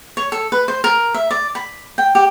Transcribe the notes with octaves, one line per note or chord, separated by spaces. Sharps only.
C#5
A4
B4
C5
A#4
E5
D5
B5
G5
G4